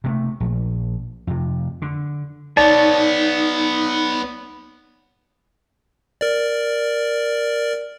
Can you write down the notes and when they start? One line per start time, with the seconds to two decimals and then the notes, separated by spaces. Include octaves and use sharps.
0.04 C3 G#3 A3
0.40 A#1
1.27 F2 C3
1.82 D3
2.57 B3 D#4 C#5 D5 A5
6.21 A#4 D5